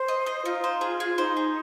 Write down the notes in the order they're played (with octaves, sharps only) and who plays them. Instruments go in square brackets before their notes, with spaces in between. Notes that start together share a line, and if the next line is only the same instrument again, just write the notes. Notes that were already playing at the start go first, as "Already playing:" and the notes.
Already playing: [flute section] C5
[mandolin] D#5
D#5
[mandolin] D#4 [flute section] F4
[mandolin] C5
G#4
G#4
[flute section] D#4 [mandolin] C5
[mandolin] G#4